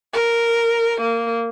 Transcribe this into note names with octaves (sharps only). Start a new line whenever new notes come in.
A#4
A#3